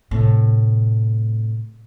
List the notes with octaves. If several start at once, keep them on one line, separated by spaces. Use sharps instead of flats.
A2 C3